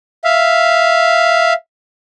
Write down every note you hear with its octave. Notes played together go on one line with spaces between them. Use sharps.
E5 F5